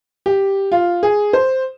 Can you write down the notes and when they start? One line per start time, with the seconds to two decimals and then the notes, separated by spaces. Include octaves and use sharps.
0.26 G4
0.72 F4
1.03 G#4
1.33 C5